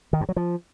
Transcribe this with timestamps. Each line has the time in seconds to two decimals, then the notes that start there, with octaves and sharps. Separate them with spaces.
0.13 D#3
0.21 G2
0.29 F#3
0.36 F3